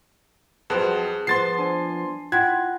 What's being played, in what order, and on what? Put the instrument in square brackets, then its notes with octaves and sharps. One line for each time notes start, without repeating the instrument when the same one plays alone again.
[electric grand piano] F2 [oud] F#3 C4 [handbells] G#4 B4 A5
[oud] F3 B3 C5 [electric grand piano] C6 A6 C7
[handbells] D4 G#5
[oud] E4 [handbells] F4 [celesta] F#5 G5 F#6 [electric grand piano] G#6